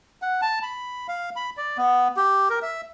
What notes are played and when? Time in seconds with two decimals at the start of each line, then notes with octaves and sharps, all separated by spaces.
0.22 F#5
0.42 A5
0.62 B5
1.08 F5
1.36 B5
1.57 D5
1.78 B3
2.17 G4
2.50 A#4
2.62 E5